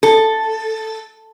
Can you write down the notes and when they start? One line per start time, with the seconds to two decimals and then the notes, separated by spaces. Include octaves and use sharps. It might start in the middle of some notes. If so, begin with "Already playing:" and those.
0.03 A4